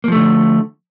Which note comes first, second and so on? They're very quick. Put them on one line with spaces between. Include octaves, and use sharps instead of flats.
A#3 F3 A3 D3